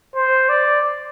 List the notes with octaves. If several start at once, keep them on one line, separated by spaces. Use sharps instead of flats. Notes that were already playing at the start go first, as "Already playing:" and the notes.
C5
D5